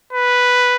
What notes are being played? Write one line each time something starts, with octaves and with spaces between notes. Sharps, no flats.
B4